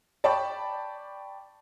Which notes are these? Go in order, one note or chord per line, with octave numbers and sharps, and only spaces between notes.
D5 G5 A5 B5 C#6